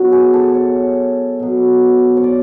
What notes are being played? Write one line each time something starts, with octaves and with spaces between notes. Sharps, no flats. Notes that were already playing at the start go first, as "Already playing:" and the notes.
Already playing: B2 F#3
G#4
A4
C#5
B2 F#3
C#5
D5